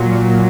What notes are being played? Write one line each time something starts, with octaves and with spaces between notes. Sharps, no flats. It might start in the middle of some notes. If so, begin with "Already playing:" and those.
Already playing: A#2 F#3